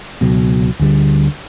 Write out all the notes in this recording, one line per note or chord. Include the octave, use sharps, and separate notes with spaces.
C#2 B2 F#3
D2 D3 G3